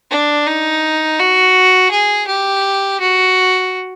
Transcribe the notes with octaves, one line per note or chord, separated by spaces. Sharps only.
D4
D#4
F#4
G#4
G4
F#4